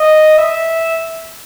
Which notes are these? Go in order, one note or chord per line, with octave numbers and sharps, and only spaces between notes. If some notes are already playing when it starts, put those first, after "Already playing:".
Already playing: D#5
E5